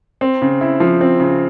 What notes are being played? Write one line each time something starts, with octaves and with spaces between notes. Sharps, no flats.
C4
C#3
E4
F3
C4
C#3